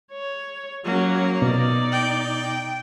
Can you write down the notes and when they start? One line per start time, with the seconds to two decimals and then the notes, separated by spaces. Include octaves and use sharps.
0.12 C#5
0.85 F#3 A#3 C#4
1.42 B2 D#4 D5
1.92 G5